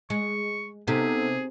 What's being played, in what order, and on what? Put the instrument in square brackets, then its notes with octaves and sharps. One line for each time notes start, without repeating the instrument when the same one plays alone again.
[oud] G#3 [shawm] C#6
[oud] C3 [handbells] B3 D#4 A4 [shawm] G#4